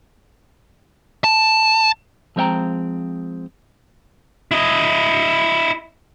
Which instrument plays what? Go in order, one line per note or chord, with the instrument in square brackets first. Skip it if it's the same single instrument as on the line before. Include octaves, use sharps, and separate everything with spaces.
[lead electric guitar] A5
[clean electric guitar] F3 G#3 C4 E5 G5 A#5
[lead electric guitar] E4 D#5